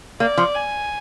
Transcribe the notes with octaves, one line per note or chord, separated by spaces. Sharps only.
A#3 D5
F3
G#5